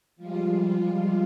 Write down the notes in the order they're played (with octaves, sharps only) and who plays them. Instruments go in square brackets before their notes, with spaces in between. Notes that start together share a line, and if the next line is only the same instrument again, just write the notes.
[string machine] F3 G3 G#3 F4